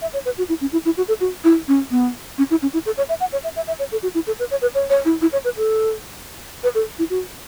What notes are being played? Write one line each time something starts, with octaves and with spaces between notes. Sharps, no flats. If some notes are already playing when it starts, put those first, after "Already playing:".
E5
C#5
B4
F#4
E4
C#4
E4
E4
F#4
A4
F#4
E4
C#4
B3
C#4
E4
C#4
E4
A4
C#5
E5
F#5
C#5
E5
E5
E5
C#5
A4
F#4
E4
A4
B4
C#5
B4
C#5
C#5
E4
E4
C#5
B4
A4
B4
A4
E4
F#4